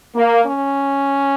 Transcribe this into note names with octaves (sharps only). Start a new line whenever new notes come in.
A#3
C#4